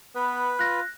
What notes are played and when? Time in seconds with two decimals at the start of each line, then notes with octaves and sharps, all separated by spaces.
0.15 B3 B4
0.59 F4 F#6 A#6